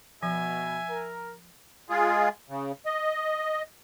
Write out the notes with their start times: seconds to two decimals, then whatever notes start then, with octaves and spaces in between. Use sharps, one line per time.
0.23 B2 F3 E5 G#5
0.88 A#4
1.88 G#3 F4 G#4
2.49 C#3
2.86 D#5